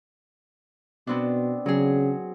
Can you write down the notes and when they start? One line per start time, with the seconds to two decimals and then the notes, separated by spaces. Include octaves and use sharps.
1.07 B2 B3 C4 D4
1.66 C#3 F#3 G#4